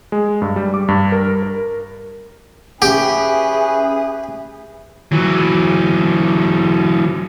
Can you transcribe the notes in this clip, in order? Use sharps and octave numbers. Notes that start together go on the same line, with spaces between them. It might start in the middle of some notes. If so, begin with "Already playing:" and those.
G#3
G2
G3
D6
G2
A#4
A#4
C#4 G4 G#4 B4 E5
E3 F#3